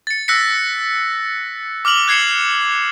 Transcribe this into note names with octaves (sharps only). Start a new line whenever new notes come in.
A6 C#7
E6 F#6 A#6 B6 C#7
D6 F6 F7 F#7
F#6 G#6 C7 C#7 E7